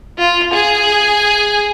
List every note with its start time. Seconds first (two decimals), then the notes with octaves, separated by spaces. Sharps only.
0.18 F4
0.52 G#4 G#5